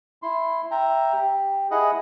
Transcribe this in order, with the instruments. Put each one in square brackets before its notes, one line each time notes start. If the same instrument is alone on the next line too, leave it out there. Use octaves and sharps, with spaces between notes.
[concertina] E4 C6
E5 G5 A#5
G4
E4 G#4 D#5 F#5